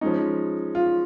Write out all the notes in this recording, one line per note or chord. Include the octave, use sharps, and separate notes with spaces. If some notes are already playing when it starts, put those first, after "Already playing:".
F3 G#3 C#4 D#4
F4